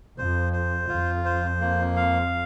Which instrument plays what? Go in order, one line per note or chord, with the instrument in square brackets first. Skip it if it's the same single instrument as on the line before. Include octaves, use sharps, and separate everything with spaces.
[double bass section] F2 [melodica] C5
[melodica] C5
[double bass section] F2 [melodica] F4
[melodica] C5
A#3
F5